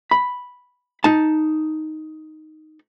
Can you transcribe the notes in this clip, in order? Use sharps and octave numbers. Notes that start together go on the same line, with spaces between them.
B5
D#4 A5